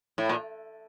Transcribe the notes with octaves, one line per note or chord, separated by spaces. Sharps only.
A2
A#2